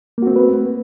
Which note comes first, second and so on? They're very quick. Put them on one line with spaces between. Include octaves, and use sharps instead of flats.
A#3 F#4 C4 A3 B4